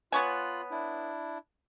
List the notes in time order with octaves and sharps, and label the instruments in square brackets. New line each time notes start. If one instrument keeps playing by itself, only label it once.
[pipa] B3 C#5 G#5 [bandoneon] F4 F#6
[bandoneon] D4 E4